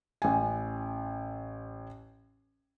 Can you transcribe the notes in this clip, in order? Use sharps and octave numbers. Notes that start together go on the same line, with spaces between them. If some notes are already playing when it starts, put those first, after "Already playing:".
A1 G#5